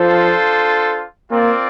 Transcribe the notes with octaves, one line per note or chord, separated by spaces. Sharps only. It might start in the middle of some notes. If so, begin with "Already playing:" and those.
Already playing: F3 D4 F4 A4 C5
A#3 C4 F4 A#4 D5